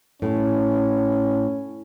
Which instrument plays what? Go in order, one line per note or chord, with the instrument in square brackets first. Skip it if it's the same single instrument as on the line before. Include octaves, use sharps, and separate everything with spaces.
[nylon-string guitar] A2 [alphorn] C#4